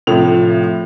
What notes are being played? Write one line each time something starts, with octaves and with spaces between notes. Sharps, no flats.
A2 C3 F3 F7